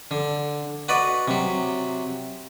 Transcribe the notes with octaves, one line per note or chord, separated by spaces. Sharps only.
D3
F#4 B4 D5 D#5
C3 F#3